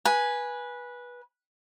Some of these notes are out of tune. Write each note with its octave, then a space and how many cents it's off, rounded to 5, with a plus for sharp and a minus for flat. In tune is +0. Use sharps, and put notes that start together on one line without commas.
B4 -15 G#5 +0